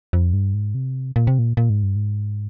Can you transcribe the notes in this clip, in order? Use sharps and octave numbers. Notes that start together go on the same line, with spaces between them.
F2
G2
G#2
C3
A#2
C3
A#2
A#2
G#2
G2
G#2